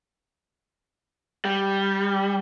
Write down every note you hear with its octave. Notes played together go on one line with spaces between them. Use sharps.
G3